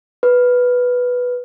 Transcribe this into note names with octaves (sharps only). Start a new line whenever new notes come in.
B4